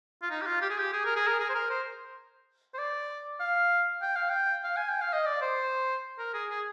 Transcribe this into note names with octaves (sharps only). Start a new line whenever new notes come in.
F4
D#4
G4
F4
G4
G#4
G4
G#4
A#4
G#4
A#4
G#4
C5
A#4
C5
C5
D5
F5
G5
F5
G5
F5
G#5
G5
F5
D#5
D5
C5
A#4
G#4
G#4